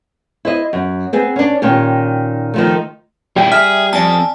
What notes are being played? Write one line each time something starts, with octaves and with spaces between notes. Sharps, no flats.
E4 C5 D#5
F#2
B3 C4 G#4
C#4 D4
A#2 D#3 C#4 G4
D#3 F3 A3
A#2 G3 E4 G5
G#4 E5 G#5 F6 B6
F2 D5 G#5 A5